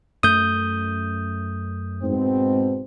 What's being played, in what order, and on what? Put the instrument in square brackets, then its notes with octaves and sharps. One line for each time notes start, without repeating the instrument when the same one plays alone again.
[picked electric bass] F#2 A3 [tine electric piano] D#6 G6
[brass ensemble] G#2 B2 C4